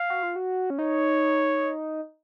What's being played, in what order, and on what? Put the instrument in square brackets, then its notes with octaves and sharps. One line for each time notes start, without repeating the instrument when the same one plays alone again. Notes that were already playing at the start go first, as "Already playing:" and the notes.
Already playing: [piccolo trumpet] F5
[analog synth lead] F#4
F4
F#4
C#4
[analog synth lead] D#4 [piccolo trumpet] C#5